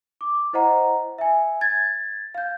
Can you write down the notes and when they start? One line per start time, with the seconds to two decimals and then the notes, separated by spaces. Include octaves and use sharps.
0.21 D6
0.53 E4 C5 D#5 F#5 A#5
1.18 E5 G#5
1.61 G#6 A6
2.35 F5 G6